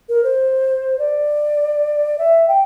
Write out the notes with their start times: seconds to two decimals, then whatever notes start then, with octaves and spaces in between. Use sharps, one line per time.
0.09 A#4
0.24 C5
0.99 D5
2.19 E5
2.48 G5